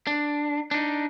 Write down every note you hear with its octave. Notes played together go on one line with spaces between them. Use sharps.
D4
D4 D#4